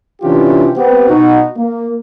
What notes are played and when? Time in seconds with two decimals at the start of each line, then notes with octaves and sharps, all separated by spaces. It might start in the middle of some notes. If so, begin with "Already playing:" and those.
0.22 C3 E3 C#4 D4 F4 G4
0.76 B3 C4 G4
1.09 B2 D#4 F#4
1.57 A#3